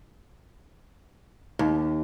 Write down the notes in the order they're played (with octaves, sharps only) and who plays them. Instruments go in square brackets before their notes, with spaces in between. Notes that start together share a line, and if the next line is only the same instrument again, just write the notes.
[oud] D#2